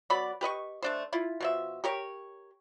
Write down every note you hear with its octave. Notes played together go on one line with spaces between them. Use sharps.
F#3 B3 D5 B5
G4 B4 D#5 C#6
A3 D4 C5
E4 F4
B2 F3 E5
G4 A#4 C#5